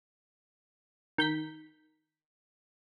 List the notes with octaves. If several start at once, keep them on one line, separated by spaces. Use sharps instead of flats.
D#3 G6 B6